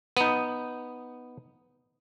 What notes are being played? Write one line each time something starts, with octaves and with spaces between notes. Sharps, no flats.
B3 D#4